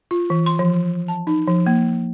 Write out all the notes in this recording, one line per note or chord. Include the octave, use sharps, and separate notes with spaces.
F4
E3
C6
F3
A5
D#4
F3
A#3